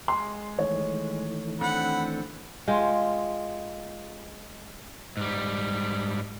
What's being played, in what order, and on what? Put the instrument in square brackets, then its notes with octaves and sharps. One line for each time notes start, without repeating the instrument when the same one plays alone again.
[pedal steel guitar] G#3 [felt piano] C6
[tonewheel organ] D#3 E3 A3 [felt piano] C#5
[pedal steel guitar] C4 D4 A4 [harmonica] F#5 B5
[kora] G#3 F4 G5
[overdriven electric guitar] G#2 G3